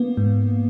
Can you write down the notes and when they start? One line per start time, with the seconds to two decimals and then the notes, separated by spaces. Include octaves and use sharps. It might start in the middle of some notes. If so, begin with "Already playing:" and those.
Already playing: A#3 B3
0.17 G#2